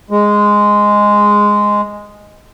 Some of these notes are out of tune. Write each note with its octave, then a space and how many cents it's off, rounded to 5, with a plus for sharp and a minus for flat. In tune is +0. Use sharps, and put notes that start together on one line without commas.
G#3 -5